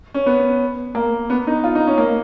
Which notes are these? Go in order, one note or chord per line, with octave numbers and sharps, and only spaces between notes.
C#4
B3
A#3
B3
D#4
F4
D#4
C#4
A#3